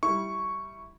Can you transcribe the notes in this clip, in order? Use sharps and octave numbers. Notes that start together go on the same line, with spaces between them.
G3 E4 C#6